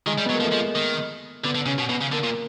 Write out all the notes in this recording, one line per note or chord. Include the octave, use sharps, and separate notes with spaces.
D#3 G#3
G3
F#3 B3
A#3
F3
A3
F3 G#3
D#3
D3 B3
D3
C#3 C#4
B2
B2 B3
C#3
D3 A#3
A#2